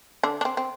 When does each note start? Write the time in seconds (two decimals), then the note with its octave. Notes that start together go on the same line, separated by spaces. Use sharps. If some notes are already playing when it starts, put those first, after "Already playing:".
0.23 D3 D4
0.41 D4
0.45 C4
0.57 C4